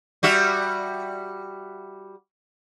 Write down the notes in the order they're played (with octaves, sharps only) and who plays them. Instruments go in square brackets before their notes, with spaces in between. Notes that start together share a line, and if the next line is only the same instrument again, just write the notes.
[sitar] G3 F#4 E5